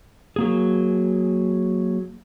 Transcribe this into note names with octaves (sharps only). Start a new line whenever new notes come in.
F#3 A#3 G#4